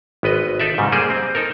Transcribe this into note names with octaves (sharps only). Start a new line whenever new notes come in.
G#1 B3 B4 D#5
D#4 A4 D5 E5
G#2 C#3 G3
G3 A#3 G#4 C5 D5
C4
D#4 A4 A#4